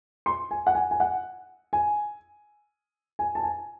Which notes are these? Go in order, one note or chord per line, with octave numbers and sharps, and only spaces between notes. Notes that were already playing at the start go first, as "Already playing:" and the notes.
C6
G#5
F#5
G#5
G#5
F#5
G#5
G#5
A5
G#5